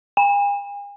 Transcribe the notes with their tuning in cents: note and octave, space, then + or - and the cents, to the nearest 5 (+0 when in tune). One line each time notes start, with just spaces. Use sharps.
G#5 -45